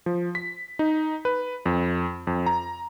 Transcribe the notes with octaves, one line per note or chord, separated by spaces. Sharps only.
F3
B6
D#4
B4
F2
F2
A#5